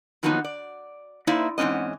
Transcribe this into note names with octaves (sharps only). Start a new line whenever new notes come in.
D#3 F3 F#3 A#3 B3 D#4
D5
A#3 D#4 E4 C5 D5 E5
E2 G#2 C4 C#4 D#5